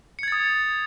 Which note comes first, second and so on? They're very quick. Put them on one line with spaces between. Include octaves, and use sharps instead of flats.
C#7 G#6 A6 D#6